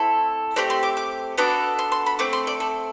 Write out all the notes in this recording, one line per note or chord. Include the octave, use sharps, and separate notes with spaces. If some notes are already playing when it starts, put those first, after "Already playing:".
Already playing: A3 C4 E4 A4
A3 C4 G4 D5
C6
D6
D6
B3 D4 F#4 A4 D6
C6
C6
B5
A3 C4 D6
C6
D5
A4